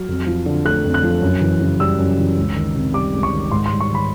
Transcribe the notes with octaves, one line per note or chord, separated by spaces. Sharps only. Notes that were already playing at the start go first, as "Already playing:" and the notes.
Already playing: F#3 F6
F2
F3
D3
A3 F#6
F2
F#6
F3
F#2
E3
C#3
G3 E6
F#2
E3
C#2
D#3
C3
G3 D6
C#2
C#6
D#3
G#2 C6
G3 C6
C#6
D#3 B5